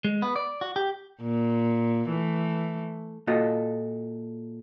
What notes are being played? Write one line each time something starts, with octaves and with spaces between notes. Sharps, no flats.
G#3
B3
D5
F#4
G4
A#2
E3 A3
A#2 F4 F#4 A4 D#5